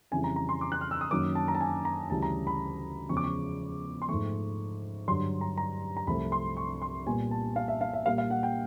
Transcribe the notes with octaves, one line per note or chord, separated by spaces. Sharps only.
F2 C#3 E3 G3 G#5
A#5
A#5
C6
D6
F#6
F6
E6
D#6
F#2 D#3 F#3 A#3 D6
A5
A#5
A5
G#5
A#5
D2 C#3 E3 G3 A5
A#5
B5
E2 C#3 F3 G#3 C#6
D6
C#6
C6
G#2 F3 A3 C#6
G2 D3 F#3 C6
A#5
A#5
A#5
C2 C3 F3 A3 C4 B5
C6
C#6
C6
A#2 G3 B3 G#5
A5
F5
E5
F5
E5
A#2 G3 A#3 F5
F5
F#5
G5